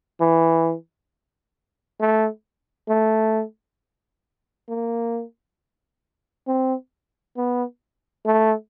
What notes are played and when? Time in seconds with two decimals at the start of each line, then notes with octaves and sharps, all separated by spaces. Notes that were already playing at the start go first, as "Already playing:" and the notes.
0.21 E3
2.00 A3
2.89 A3
4.69 A#3
6.47 C4
7.37 B3
8.26 A3